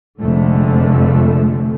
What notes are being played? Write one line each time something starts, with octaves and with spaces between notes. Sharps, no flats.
F1 F2 D3 G#3 A3